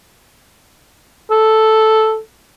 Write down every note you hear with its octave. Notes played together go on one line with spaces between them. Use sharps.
A4